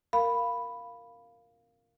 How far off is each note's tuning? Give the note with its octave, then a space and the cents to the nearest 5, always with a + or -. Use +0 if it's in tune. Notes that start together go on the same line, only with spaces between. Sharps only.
A#4 -10 F5 +0 B5 +0